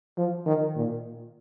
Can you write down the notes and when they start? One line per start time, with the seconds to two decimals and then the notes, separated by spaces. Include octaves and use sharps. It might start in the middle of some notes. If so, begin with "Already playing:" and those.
0.18 F3
0.46 D#3
0.75 A#2